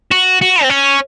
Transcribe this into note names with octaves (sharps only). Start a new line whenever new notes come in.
F#4
F#4
C4
C#4